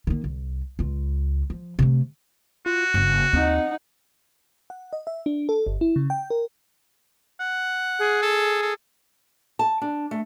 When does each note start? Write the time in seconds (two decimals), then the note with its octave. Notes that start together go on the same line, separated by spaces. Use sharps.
0.07 D#3 A#3
0.24 C2
0.79 C#2 F4
1.50 F3
1.79 C3 A3
2.66 F4 F#4
2.94 F#1 G2
3.33 D#2 C4 D#4 F#5
4.70 F#5
4.93 D#5
5.07 E5
5.26 D4
5.49 A4
5.67 G1
5.81 E4
5.96 C#3
6.10 G5
6.30 A#4
7.40 F#5
7.99 G#4
8.22 A4
8.62 A4
9.59 A5
9.82 D4
10.11 A3